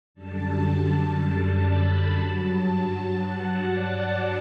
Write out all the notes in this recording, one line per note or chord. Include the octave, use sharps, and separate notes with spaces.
F#2 D3 G3 A5
B5
G2 F#3 A5
F#5
D5